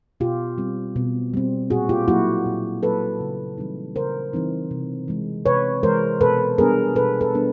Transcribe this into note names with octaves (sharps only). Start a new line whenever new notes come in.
B2 F4 G4
G3 C4
B2
G3 C4
A#2 F#4 G#4
F4 G4
F#3 A#3 E4 F#4
A#2
F#3 A#3 A4 B4
C#3
E3 G3 C4 D#4
C#3 A#4 C5
E3 G3 C4 D#4
C3
E3 G#3
C3 B4 C#5
E3 G#3 A#4 C5
B2 A4 B4
G3 B3 D4 G#4 A#4
B2 A4 B4
A4 B4
G3 B3 D4